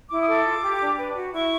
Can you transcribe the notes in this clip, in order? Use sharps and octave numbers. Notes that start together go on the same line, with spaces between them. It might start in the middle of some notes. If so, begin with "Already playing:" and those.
E4 D6
D#6
A4 D6
F4
G4
D4
B4
F#4
E4 C#6